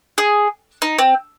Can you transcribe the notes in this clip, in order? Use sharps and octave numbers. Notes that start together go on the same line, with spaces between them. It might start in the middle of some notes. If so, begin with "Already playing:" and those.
G#4
D#4
C4